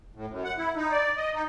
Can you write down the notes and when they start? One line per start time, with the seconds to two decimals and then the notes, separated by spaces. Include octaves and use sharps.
0.15 A2
0.30 F#2
0.45 F#5
0.58 E4
0.76 D#4
0.91 D5
1.17 D#5
1.35 D#4